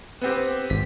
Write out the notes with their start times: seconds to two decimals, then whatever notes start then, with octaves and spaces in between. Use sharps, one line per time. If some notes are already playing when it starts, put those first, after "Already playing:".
0.21 B3 C4 G4
0.70 G#1 B6